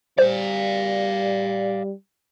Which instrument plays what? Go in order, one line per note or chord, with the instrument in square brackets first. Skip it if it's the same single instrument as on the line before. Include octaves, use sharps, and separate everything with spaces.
[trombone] G3 [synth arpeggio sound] C5 [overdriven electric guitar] D5 F5